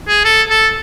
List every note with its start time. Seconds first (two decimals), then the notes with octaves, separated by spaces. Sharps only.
0.09 G#4
0.25 A4
0.50 A4